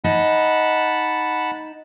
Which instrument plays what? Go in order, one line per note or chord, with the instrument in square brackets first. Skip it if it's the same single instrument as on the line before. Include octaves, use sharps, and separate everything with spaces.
[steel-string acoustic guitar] D#4 [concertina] F#5 A5 B5